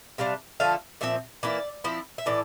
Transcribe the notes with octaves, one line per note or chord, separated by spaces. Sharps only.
C3 G3 D4 F5
D3 F3 A3 F5
A#2 F3 C4 E5
E3 A#3 E4 D5
F3 C4 E4
E5
A2 E3 D5